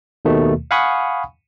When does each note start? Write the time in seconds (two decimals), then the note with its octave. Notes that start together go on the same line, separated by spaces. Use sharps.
0.25 D#2 B2 D#3 A3
0.71 F5 F#5 G#5 B5 C#6 D#6